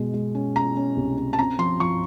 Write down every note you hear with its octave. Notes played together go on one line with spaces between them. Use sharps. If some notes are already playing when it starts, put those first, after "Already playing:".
Already playing: B2 G#3
G#3
C#4
C#4 A#5
C#4
C2
C#4
A5
C4 A#5
F3 C6
F3 C#6